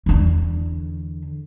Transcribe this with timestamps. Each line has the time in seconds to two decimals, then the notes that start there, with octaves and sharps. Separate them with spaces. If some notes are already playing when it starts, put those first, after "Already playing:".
0.06 E2 D3